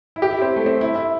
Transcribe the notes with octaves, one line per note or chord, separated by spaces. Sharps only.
E4
G4
E4
C4
A3
C4
E4
E4